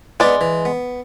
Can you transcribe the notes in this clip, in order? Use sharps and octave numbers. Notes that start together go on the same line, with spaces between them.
G#3 B3 D#4 B4 D5
E3
B3